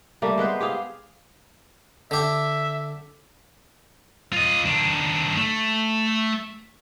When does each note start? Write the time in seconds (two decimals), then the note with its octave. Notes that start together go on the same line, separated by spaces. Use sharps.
0.22 G3 A3 A#3
0.38 G#3 B3 B4 C5
0.60 G4 G#4 F5
2.11 D3 G4 E5
4.33 F4 D#5
4.66 D#3 D4
5.37 A3